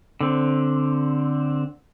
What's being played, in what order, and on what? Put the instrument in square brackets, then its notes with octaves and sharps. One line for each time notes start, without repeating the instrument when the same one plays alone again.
[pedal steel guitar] D3 C4